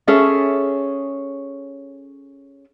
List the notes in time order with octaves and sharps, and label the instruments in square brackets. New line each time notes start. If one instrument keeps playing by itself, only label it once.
[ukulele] C#4 G#4 A4 E5